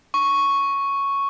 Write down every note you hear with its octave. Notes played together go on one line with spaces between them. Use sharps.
C#6